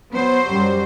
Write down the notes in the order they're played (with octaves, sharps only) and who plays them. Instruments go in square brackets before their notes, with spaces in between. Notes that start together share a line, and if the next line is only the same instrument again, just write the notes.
[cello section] F#3 C5 [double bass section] B3
[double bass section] F#2 G3